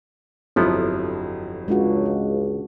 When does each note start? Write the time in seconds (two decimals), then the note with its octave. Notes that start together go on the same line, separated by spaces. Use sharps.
0.56 G1 F2 F3 F#3 B3 E4 A4
1.68 C#2 G#3 D4 F#4